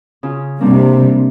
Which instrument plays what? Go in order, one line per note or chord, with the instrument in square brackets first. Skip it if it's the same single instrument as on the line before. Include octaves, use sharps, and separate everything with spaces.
[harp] C#3 F4
[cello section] C3 G3 [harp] A#3 C4 D4